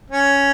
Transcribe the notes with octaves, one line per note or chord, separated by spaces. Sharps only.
C#4